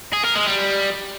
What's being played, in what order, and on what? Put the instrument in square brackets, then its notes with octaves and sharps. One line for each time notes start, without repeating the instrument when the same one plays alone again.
[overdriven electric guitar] G#4
A#4
G#3
G3